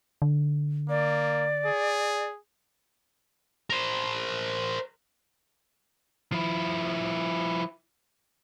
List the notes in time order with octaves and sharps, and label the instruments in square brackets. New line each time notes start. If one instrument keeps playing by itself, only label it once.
[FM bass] D3
[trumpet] A#3 [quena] D5
[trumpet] G#4
[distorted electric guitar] A#4 C5
[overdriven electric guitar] F3 E4